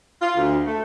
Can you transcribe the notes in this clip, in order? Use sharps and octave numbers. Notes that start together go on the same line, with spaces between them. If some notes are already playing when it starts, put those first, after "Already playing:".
F4
D2
A3